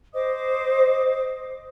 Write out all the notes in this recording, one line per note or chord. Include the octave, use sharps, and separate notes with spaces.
C5 D#5 D6 D#6